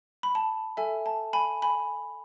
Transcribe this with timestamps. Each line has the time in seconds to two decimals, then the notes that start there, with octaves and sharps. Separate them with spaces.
0.23 B5
0.35 A5
0.77 A4 E5 G#5
1.06 A5
1.33 G#5 B5
1.62 G#5 B5